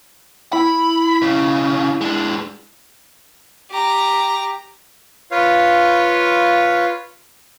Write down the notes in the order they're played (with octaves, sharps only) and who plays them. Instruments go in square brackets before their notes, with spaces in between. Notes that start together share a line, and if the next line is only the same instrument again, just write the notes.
[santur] E4 [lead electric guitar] B5
[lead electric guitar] B1 C#3
G#3 D4
[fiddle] G4 A#5
[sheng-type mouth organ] F4 B4 C#5 F5